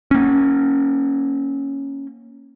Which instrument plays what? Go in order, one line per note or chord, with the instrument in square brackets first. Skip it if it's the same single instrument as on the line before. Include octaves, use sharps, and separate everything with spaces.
[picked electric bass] A#3 C#4